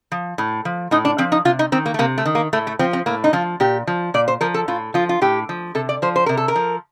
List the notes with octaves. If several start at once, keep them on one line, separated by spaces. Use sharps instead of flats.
F3
A2
F3
A2 D#4
D4
F3 C4
D#4
C3 F4
D#4
D#3 C4
A#3
A3
C3 A#3
A3
D#3
A#3
A2 A3
A3
F3 C4
C4
A2 A#3
D#4
F3 F4
A#2 G4
F3
A#2 D5
C5
F3 A#4
A4
A2 F4
F3 F4
F4
A2 G4
F3
C3 A4
D5
F3 C5
C5
C3 A#4
A4
A#4
F3